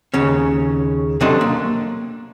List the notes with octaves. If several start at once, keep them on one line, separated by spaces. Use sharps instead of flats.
D#2 C#3 C#4
C3 F#3 D4 A4 D#5 C6
A#3